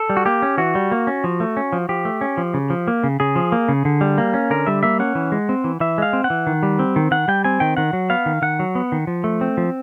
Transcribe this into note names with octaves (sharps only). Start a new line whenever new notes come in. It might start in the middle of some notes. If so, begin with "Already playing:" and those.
Already playing: A4
G3
F#4
A#3 G4
C#4
E3 F#4
G3
A#3
C#4
F3
A3
C#4
F3
F3 G4
A3
C#4
F3
C#3
F3
A#3
C#3
C#3 G#4
F3
A#3
C#3
D3
G3
A#3
C#4
D3 A#4
G3 E5
A#3 E5
C#4 F#5
E3
G#3
C4
E3
E3 E5
G#3 F5
C4
F#5
E3
D#3
G3
C4
D#3
D#3 F#5
G3 G5
C4 G#5
D#3 G5
D#3 F#5
F#3
B3 F5
D#3
D#3 F#5
F#3
B3
D#3
F3
A3
C4
F3